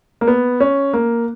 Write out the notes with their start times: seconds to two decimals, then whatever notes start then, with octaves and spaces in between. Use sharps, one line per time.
0.21 A#3
0.27 B3
0.60 C#4
0.93 A#3